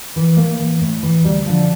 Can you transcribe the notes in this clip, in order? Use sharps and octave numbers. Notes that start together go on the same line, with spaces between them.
E3
A2 A#3
E3
A2
E3
D2 G3
D3 F3